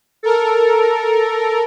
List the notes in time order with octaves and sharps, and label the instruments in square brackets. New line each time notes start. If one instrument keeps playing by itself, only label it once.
[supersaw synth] A4 A#4